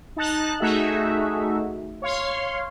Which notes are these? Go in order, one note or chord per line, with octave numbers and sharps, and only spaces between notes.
D#4 A5 F#6
A3 D#4 F#4 G#4 E5
C#5 F5 C6